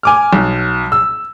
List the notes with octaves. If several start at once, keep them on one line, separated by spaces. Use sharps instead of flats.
G#5 D6 F6
B1
E6